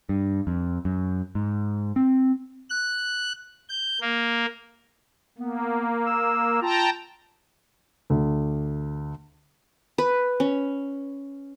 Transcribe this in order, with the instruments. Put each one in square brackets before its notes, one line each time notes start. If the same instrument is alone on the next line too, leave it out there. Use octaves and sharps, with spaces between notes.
[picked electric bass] G2
F2
F#2
G#2
C4
[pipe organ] F#6
G6
A#3
[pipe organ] A#3 [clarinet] B3
[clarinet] E6
[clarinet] F4 [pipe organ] G5 A5 A#5
[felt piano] D2
[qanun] B4
C#4